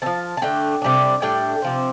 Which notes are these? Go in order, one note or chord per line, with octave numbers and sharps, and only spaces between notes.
F3 C4 A5
A5
D3 A3 D4 G5
C3 G3 D4
A2 G3 D4 G5
C3 F3 C4